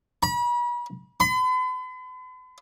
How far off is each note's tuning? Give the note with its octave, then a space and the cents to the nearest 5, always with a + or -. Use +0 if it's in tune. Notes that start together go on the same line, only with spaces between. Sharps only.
B5 -40
B5 +45